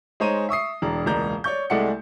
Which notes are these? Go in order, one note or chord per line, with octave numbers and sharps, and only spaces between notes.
G#3 D#4 C5 C#5 A#5 D#7
E5 C#6 D#6 C7
E1 D4 A#5
E1 C#2 A#3 D5 A#5 G6
C#5 D5 C#6 G6
C2 G#3 A3 D5 F#5 C#7